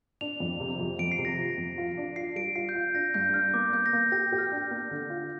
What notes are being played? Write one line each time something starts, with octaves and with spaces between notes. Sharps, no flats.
D4 F7
F2
C3
F2
F2 D7
C7
C3
A#6
F3
F2
F4
D4
F4 C7
G3 D7
F4 C7
G6
F4
D4 A#6
G2 G6
D4 F6
A#3 D6
A#3 G6
A#6
A#3
G4 A#6
G4
F6
D4
A#3
D3
F4